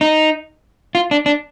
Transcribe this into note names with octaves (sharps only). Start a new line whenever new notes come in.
D#4
F4
D4
D4